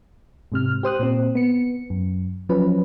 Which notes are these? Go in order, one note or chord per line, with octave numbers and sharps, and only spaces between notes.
G#2 C3 F6
G4 C5 D#6 F#6
A#2 C4
B3 C#7
F#2
F3 F#3 C#4 B4